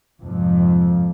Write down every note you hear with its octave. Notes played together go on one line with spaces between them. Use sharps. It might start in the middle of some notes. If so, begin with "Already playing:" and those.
F2 G#2 C3 F3